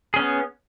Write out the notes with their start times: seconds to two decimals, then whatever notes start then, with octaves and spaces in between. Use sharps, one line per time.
0.14 G#4
0.16 C#4
0.19 B3